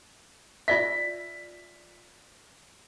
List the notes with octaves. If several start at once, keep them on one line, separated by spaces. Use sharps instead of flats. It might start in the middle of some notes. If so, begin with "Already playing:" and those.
F4 D5 E5 B6